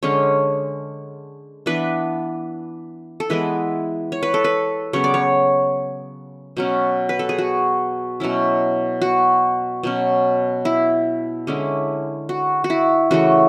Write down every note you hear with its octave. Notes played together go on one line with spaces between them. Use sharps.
D3 G#3 C#4 C#5
E3 B3 D4 B4
A4
E3 G#3 B3 E4 B4
C#5
B4
A4
B4
C#3 F#3 B3 C#5
D5
C#5
B2 F#3 C#4
B4
A4
G#4
F#4
B2 F#3 C#4 E4
F#4
B2 F#3 C#4
E4
D3 G#3 C#4 E4
F#4
F#4
E4
C#3 E3 A3 F#4